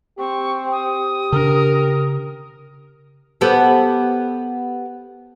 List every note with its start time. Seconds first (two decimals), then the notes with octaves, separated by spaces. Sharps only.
0.19 C4 G4 C#6
0.72 D#6
1.32 C#3 D4 A#4
3.41 B3 G4 A4